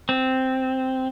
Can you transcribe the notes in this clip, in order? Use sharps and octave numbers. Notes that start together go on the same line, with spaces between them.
C4